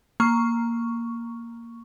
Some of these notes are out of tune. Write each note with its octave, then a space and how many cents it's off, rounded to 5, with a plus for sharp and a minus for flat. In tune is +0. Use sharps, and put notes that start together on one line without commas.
A#3 +0 C#6 +5